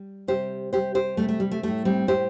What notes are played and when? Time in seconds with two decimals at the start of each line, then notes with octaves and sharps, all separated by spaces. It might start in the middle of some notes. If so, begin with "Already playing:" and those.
Already playing: G3
0.28 C3 G3 G4 C5
0.73 C3 G3 G4 C5
0.95 G4 C5
1.17 C3 G3 A3
1.28 A3
1.40 G3
1.51 A3
1.63 A2 G3 A3
1.85 G3 C4
2.07 A2 G3 G4 C5